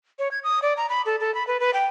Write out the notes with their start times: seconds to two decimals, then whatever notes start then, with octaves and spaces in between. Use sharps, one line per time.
0.19 C#5
0.31 G#6
0.44 D#6
0.62 D5
0.77 A#5
0.89 B5
1.06 A4
1.20 A4
1.35 B5
1.47 B4
1.60 B4
1.74 G5